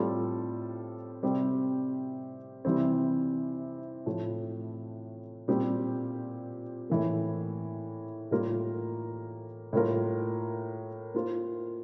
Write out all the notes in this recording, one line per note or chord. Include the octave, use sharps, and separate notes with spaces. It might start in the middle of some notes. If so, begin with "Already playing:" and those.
Already playing: A2 G3 C4 F4 A4
C3 G3 C4 G4
C3 E3 G3 C4
A2 F3 A3
A#2 G3 C4 G4
A2 E3 A#3
A2 G3 A#3 F4 A#4
A2 G3 A#3 F4 A#4
A#3 F4 C5